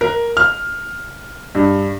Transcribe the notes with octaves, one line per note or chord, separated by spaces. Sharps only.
A#4
F6
G2